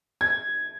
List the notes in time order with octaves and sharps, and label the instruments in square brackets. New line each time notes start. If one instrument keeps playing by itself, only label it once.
[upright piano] G#6